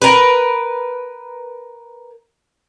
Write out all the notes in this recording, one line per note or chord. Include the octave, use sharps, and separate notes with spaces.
A#4 B4